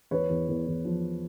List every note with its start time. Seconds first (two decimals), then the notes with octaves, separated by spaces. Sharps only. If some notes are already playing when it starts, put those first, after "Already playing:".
0.11 E2 B4 C#5
0.29 E2
0.48 E2
0.67 E2
0.85 F3